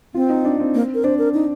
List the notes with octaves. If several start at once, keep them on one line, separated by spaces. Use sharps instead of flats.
C4 F4
D#4
D4
C4
A#3
A#4
D4 C5
A#4
D#4